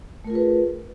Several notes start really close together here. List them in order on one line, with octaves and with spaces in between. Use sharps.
A3 A#4 F4 G#4 B4